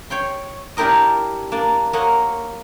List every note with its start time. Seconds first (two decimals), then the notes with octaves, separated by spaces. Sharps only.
0.10 C#5 G5 C6
0.77 D4 E4 G4 A#4 D#5
1.52 A#3 D4 D5
1.93 A#3 C#5 D#5 F#5